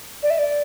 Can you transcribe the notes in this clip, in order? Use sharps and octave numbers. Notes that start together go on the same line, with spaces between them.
D5
E5
D5